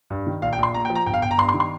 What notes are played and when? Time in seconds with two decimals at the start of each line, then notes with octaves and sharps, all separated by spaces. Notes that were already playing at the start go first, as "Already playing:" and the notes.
0.10 G2
0.27 D#3
0.42 A#1 F5
0.53 G5
0.58 A#1 C6
0.74 A#2 A#5
0.85 G5
0.90 F3
0.95 A#5
1.06 G1 G5
1.14 F5
1.22 G1 G5
1.31 A#5
1.38 G2 C6
1.49 C6
1.54 D#3
1.60 C6